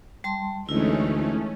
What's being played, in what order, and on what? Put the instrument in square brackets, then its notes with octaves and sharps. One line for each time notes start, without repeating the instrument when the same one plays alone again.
[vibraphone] G3 A5 C6
[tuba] D2 [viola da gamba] E3 G#3 D#4 [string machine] A3 C#4 [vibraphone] E4